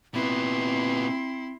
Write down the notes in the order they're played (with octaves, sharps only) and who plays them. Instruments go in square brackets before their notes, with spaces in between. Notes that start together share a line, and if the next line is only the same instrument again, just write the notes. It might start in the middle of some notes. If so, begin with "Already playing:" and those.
[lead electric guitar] A#2 B3 [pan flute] C4 [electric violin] E4 C6